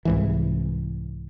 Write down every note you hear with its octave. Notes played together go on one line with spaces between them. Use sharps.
C2 G#2 E3